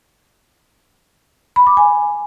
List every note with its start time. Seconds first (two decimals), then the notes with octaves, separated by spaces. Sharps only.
1.56 B5
1.67 D6
1.77 G#5